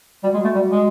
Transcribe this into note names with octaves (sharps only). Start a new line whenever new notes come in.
G3 F#4
G#3
F#4
A3
G3
G#3